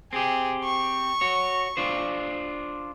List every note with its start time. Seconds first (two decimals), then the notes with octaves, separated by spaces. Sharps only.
0.13 C4 G4 G#4
0.64 C#6
1.21 F#4 C#5
1.77 D4 F4 C5